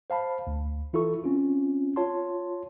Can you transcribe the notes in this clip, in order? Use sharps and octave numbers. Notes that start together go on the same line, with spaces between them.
C5 F5 A5 B5
D2
E3 E4 F4 A4 C#6
C4 C#4 F4
F4 C#5 A5 C6